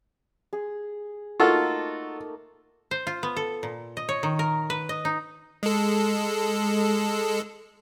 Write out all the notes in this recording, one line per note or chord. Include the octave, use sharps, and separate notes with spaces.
G#4
A3 A#3 D#4 F4 F#4 A4
C5
F4
B3
A4
A#2
D#5
C#5
D#3
A#4
B4
D#5
D#4
G#3 A4